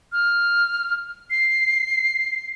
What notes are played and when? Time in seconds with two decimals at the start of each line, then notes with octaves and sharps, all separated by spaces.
0.12 F6
1.30 C7